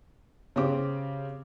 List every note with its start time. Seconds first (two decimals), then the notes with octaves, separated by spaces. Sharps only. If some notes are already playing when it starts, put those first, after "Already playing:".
0.56 C#3 C4 G4 D6